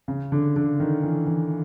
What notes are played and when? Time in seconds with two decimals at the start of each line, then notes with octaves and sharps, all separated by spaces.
0.08 C#3
0.32 D3
0.56 D3
0.80 D#3
1.03 E3
1.27 E3